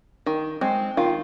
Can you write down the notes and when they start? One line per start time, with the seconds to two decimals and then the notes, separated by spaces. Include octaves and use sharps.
0.26 D#3
0.61 G#3 C4
0.97 D#3 F4